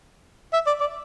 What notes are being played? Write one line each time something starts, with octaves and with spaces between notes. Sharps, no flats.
E5
D5
D5